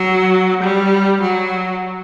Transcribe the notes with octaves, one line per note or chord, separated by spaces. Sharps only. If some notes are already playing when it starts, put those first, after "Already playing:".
Already playing: F#3
G3
F#3